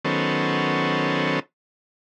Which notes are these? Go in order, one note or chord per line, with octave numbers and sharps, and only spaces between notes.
D#3 F#3 B3 C#4 A4 C5